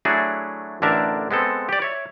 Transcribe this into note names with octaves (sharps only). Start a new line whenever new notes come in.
F#3 A3 D4 E4 F#4 G#4
A1 D3 D4 A#4 E5 A5
G#3 B3 C4 A4
G4 D5
C#5 E5